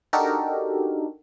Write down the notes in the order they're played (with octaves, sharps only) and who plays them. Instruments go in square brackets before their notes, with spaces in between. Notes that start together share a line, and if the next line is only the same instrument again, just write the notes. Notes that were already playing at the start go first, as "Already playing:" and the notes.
[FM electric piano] D4 D#4 F#4 G4 A4 A#4